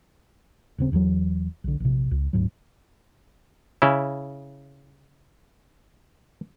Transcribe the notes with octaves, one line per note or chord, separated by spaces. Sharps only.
D#1 C#3 C4
E1 E2 B2 F#3
B1 D3
A#1 C3
C#2
D1 G#2 F#3
C#3 E4